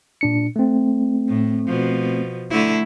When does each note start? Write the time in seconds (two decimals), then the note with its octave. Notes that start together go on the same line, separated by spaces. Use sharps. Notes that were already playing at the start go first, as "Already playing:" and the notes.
0.21 A#2 D4 C#7
0.56 A3 C4
1.29 A2
1.67 B2 F3
2.50 D3 A3 E4